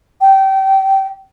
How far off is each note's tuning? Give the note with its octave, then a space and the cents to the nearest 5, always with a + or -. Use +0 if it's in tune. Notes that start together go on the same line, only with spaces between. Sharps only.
G5 -25